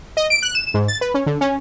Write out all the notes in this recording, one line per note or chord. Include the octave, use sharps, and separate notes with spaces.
D#5
D7
F#6
E7
G#2
A6
B4
C#4
D3
C#4